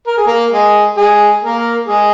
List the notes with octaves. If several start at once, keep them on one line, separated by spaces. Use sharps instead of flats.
A#4
G#4
A#3 A#4
G#3 G#4
G#3 G#4
A#3 A#4
G#3 G#4